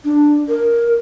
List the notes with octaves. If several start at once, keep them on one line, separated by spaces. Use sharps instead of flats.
D4
A#4